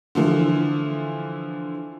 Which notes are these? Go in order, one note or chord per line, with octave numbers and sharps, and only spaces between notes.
D3 E3 F3